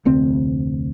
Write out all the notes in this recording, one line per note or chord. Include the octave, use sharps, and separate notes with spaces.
F1 D2 C4